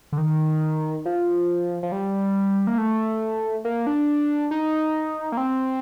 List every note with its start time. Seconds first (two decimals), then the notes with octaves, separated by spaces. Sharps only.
0.12 D3
0.18 D#3
1.05 F3
1.83 F3
1.92 G3
2.67 A#3
2.78 A3
3.65 A#3
3.87 D4
4.51 D#4
5.32 A#3
5.37 C4